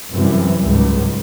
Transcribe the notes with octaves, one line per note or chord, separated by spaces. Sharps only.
F#2 C3 E3 G3
C#2 G#2